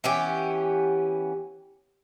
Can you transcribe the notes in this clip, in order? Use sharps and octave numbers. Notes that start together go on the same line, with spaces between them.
E3 B3 C#4 G4